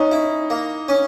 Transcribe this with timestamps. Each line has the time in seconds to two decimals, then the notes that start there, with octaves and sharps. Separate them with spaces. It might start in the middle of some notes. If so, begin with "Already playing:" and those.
Already playing: C#4 D#4
0.12 E4
0.50 A#3
0.88 C#4